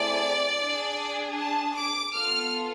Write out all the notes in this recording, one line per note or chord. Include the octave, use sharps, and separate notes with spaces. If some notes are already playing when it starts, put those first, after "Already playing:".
Already playing: A3 C4 E4 G#4 D5
D4 G#4
A5
D6
B3 F4 A4 F6